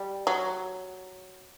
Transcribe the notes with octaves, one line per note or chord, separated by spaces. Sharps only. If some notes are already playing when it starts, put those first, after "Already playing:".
Already playing: G3
F#3